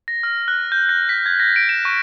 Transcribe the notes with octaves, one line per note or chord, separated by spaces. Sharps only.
A#6
F6
F#6
G6
A#6
B6
G#6
A#6
D7
E7
C#6